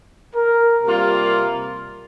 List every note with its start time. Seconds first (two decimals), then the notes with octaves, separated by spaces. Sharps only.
0.34 A#4
0.84 C3 G3 A#3 F4